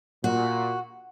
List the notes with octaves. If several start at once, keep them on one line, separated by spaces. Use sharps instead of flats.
A#2 F#4